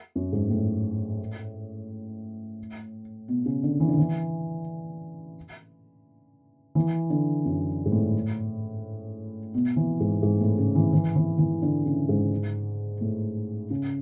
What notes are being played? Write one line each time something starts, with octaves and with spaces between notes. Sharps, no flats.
F#2
G#2
A2
B2
C#3
D3
E3
D3
E3
E3
D3
F#2
G#2
A2
B2
E3
G#2
G#2
A2
C#3
E3
E3
E3
E3
D3
C#3
G#2
A2
C#3